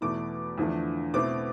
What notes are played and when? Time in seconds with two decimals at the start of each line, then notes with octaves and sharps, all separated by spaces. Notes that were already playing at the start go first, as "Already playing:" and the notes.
0.01 E2 B2 A3 E4 D6
0.58 E2 D3 F3 A3 D4
1.14 B2 A3 C4 E4 D6